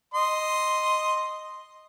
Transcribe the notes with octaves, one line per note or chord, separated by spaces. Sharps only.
D#5 C6